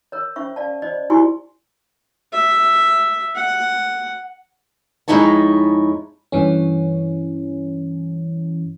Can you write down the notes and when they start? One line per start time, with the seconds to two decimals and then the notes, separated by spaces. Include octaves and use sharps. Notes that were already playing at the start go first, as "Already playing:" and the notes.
0.12 A#4 C#5
0.36 C#4 C5 E5 C#6
0.56 D5 F5 A5
0.82 C5 D5 D#5
1.10 E4 F#4 G4 G#5 C6 C#6
2.33 E5
3.35 F#5
5.08 F2 G#3 D#4 E4 C#5 A5
6.32 G2 E3 C#4